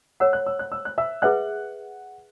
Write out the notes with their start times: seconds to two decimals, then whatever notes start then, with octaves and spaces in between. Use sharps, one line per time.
0.20 A4 C#5 F#5 E6
0.33 F#6
0.46 E6
0.59 F#6
0.72 E6
0.85 F#6
0.98 E5 E6
1.22 G#4 B4 E5 F#5 F#6